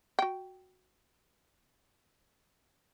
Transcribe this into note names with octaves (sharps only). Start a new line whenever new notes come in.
F#4 G5